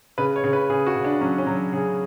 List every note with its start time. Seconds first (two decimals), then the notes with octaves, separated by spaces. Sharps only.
0.18 C#3 B4
0.36 C#5
0.44 C#3
0.53 B4
0.70 C#3 G#4
0.86 F#4
0.96 C#3
1.04 D4
1.21 F#3 C#4
1.38 C#4
1.47 F#3
1.73 C#3 G#4